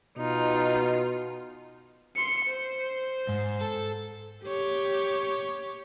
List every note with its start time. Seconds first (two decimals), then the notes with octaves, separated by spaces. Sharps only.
0.18 B2 D#4 F4
2.16 C6 C#7
2.45 C5
3.29 G#2
3.61 A4
4.44 G4 C#5